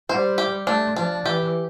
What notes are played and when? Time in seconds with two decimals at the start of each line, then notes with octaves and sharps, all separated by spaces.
0.09 G3 C5
0.38 G4
0.67 A3 D4
0.96 F3 D4
1.26 E3 G4